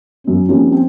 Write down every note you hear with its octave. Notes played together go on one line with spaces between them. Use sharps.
F#2 C#4
F3 G3 A#3 C4 C#4 D#4
C4